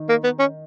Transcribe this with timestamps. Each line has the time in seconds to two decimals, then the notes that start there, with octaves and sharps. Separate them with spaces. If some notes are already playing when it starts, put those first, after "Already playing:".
Already playing: D#3 D#4
0.09 A#3
0.24 B3
0.39 C#4